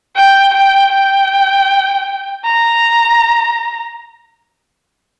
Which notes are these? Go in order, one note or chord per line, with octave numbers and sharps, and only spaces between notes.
G5
G5
G5
A#5